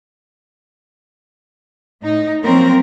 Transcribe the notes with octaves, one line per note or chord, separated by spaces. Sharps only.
A2 D#4
F3 F#3 A#3 C4 C#4 A#4